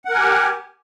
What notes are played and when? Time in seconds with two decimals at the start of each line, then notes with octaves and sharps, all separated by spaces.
0.05 F#5
0.09 A#4
0.14 G#5
0.19 G4